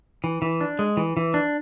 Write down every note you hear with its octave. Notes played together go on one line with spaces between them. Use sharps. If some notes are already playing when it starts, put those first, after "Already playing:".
E3
E3
D4
G#3
E3
E3
D4